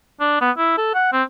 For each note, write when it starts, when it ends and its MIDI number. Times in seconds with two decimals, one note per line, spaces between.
0.21 0.40 62
0.41 0.51 59
0.58 0.73 64
0.78 0.90 69
0.94 1.12 78
1.13 1.23 60